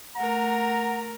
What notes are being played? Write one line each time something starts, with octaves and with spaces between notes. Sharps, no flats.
A3 A#4 F#5 A#5